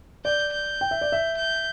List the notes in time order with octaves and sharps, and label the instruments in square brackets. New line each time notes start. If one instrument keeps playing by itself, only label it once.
[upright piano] D5 [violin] G6
[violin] G6
[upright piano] G5
E5
D5
E5
[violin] G6